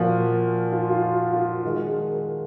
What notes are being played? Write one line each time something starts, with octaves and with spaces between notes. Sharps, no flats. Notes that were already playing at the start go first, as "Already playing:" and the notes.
Already playing: A#2 F3 A#3 F#4
F4
F4
F#4
F4
D#3 G#3 F#4
G#4
A#4